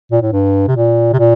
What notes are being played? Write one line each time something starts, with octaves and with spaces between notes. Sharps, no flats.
A#2
A2
G2
C3
A#2
C3
A#2